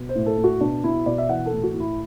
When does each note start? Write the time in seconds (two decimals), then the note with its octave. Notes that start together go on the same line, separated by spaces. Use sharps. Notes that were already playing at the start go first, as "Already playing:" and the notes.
Already playing: B2
0.09 C5
0.15 A2
0.26 A4
0.38 A2
0.44 F#4
0.61 B2 D4
0.84 B2 E4
1.06 B2 D5
1.18 E5
1.29 E3 F#5
1.46 A4
1.51 A2
1.63 F#4
1.74 A2
1.80 E4